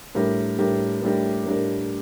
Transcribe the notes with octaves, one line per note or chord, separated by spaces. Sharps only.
A2 G3 D4 G4 A#4
A2 G3 D4 G4 A#4
A2 G3 D4 G4 A#4
A2 G3 D4 G4 A#4